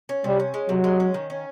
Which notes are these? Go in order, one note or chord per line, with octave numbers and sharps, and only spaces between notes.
C#4
C3 G3
C#4
G#3
C3 F#3
G#3
C#4
D#3
C#4